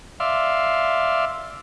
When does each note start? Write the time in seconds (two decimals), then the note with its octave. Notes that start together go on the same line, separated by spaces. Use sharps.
0.20 D5 E5 F5 C6